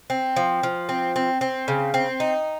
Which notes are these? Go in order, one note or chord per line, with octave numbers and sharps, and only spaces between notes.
C4
F3
F3
C4
C4
C4
C#3
C4
D#4